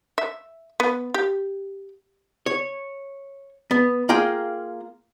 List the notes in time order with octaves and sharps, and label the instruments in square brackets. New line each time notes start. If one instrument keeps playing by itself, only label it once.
[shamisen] E5
B3
G4
[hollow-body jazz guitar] C#5
B3
A#3 F4 G#4 G5